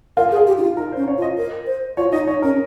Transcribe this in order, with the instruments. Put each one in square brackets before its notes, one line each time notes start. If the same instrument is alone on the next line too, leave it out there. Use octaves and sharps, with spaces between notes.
[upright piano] F4 [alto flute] A#4
[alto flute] G#4
[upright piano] F4
[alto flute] G4
D#4
F4
[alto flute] D#4 [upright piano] A#4
[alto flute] C#4 [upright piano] C5
[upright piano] C#5
[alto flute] F4
[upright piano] D#5
[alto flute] A#4
C5
[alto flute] F4 [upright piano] C#5
[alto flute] D#4 [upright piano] D#5
[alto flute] D#4 [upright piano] C#5
[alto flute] C#4 [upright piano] A#4